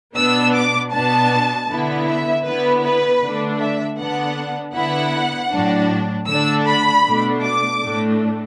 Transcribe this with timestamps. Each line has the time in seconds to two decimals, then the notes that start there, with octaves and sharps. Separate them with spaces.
0.16 B2 B3 D4 E6
0.54 D6
0.92 B2 B3 D4 A5
1.69 D3 B3 E4
2.07 E5
2.45 D3 B3 E4 B4
2.84 B4
3.22 D3 A3 D4
3.60 E5
3.98 D3 B3 D4 F#5
4.74 D3 B3 E4 F#5
5.51 A2 F#3 D4
6.27 D3 A3 D4 E6
6.66 B5
7.04 B2 A3 D4
7.42 D6
7.80 A2 A3 D4